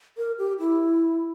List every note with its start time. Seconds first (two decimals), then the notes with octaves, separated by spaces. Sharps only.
0.17 A#4
0.38 G4
0.59 E4